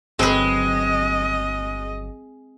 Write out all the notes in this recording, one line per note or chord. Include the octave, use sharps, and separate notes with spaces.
G1 F#3 G#3 C4 B4 D#5